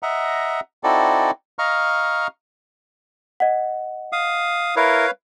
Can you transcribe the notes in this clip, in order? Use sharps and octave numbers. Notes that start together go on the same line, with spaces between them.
D#5 E5 F#5 A#5
C4 D#4 E4 F#4 A4 D5
D#5 F5 A#5 C#6 F6
D#5 F#5
F5 D#6
E4 A#4 B4 C#5 F5